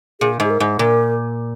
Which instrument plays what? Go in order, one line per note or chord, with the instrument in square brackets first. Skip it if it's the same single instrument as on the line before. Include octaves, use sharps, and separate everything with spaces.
[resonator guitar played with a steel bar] A#2 [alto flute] G#4
[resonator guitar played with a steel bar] G#2 [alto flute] G#4
[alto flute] A#4
[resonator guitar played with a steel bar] G#2
[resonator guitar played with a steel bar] A#2 [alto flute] A#4